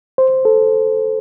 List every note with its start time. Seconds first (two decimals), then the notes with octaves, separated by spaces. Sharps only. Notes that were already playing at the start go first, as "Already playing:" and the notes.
0.18 C5
0.45 A4